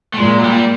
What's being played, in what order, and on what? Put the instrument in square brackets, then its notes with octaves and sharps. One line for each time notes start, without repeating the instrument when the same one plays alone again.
[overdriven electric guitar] A3
[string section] A#2 [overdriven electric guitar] G#3
[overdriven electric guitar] F#3
G3